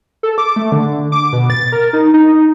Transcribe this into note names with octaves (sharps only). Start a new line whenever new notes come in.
A4
D6
A3
D3
D6
B2
A6
A#4
D#4
D#4